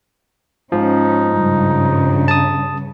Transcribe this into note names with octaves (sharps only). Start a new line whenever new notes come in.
G#2 F3 C#4 D#4
G2 C#3
A5 D#6